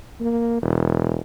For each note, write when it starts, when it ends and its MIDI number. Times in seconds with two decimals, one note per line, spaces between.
0.21 0.58 58
0.62 1.22 28